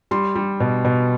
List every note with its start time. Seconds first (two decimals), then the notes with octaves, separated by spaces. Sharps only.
0.11 G3 C6
0.35 G3
0.60 B2
0.85 B2